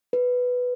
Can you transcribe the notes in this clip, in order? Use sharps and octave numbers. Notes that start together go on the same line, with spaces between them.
B4